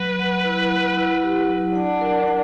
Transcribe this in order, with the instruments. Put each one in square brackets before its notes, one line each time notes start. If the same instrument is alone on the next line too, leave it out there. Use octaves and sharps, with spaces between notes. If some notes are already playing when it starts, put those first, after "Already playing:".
Already playing: [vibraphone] F#3 [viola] B4
[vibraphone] F#5
E4
F#5
E4
G4
F#3
[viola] D4 [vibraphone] F#5
[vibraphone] A#4
F#5